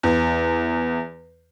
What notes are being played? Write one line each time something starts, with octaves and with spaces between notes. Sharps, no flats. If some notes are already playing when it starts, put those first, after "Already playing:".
E2